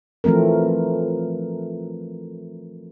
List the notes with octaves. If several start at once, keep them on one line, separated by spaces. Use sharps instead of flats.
E3 F3 A3 C4 A#4